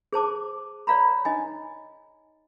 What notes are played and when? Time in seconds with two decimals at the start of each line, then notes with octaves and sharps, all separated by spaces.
0.13 G#4 C5 A5 D6
0.87 C#5 D5 F5 A#5 B5
1.25 D#4 D#5 G#5